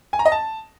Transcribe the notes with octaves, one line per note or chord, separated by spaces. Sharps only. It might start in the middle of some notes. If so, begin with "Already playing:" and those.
G#5
A#5
D#5
A5